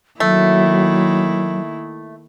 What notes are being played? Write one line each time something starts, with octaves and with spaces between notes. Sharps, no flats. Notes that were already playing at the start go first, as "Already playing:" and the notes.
D#3 F#3 A3 A#3 E4